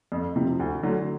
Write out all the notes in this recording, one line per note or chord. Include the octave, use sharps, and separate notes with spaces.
F2
C3 F3
D2
D3 F#3 A3